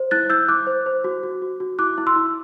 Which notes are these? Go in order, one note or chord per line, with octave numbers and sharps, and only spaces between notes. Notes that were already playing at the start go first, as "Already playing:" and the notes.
Already playing: C5
E4 F#6 A6
E4 E6 G6
E4 D6 F#6
C5
C5
F#4
F#4
F#4
F#4
E4 D6 F#6
E4
C6 E6
E4